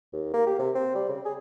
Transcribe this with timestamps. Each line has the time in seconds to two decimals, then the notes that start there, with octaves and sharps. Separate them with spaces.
0.13 D#2
0.34 A#3
0.46 G4
0.59 C3
0.75 C4
0.95 G3
1.09 C#3
1.25 G#4